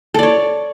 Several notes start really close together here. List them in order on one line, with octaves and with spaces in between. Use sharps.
A4 D5 C#5